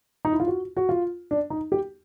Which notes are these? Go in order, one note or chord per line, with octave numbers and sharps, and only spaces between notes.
D#4
E4
F4
F#4
F#4
F4
D4
D#4
G4